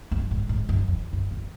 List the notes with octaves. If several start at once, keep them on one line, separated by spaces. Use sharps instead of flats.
F#2
G#2
G#2
F#2
F2
F#2
F#2